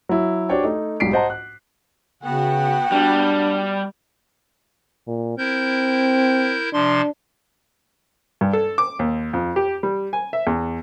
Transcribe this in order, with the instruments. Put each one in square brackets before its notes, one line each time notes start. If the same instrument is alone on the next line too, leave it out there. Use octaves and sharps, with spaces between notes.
[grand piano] F#3 E4
D4 F#4 G4 C5 C#5 G5
A3 D#4
B1 G#2 G3 B6 C7 D7
C5 D#5 F#5 A5 A#5
F#6
[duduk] C#3 [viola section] B3 F#4 F#5 [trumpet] G5
[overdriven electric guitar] G3 [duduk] D4
[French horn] A#2
[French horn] C4 [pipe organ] E4 A#4 G6
[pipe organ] C3 F3 C6 [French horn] D4
[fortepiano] G2
A4
D6
D#2
F2
G4
G3
G#5
E5
E2